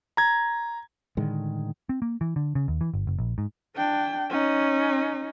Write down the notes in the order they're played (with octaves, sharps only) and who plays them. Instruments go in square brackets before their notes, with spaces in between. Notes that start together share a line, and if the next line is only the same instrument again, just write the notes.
[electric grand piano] A#5 G#6
[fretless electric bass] A2 D3 D#3 G#3
[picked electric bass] C4
A#3
E3
D3
C#3
D#2
E3
G1
F#1
A#1
G#2
[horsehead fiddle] D4 G5
C#4 D#4